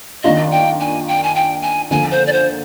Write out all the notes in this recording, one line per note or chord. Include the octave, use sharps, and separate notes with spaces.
D#3 A#3 D4 F4 D#5
G5
G#5
G5
G#5
G5
G#5
D3 F3 A#3 G#5
C5
D5
C5